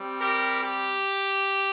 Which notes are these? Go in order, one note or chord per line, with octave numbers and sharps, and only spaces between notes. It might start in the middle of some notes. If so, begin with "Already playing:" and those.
Already playing: G3 C4
G4 A#4
G4